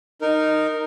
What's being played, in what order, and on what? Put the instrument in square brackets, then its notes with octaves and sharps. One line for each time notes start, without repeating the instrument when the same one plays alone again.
[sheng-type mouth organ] D#4 A#4